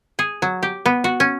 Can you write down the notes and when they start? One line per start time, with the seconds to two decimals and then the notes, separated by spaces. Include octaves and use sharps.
0.19 G#4
0.42 F#3
0.63 G4
0.86 B3
1.04 F#4
1.20 C#4